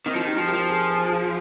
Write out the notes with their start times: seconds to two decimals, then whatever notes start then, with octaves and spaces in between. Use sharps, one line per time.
0.06 D#3 C4 D#4
0.15 F3
0.21 D#3
0.27 D#4 G4
0.37 F3
0.48 G4 A#4
0.54 F3
0.69 G#4 C5
0.90 G#4 C5
1.12 F4 G#4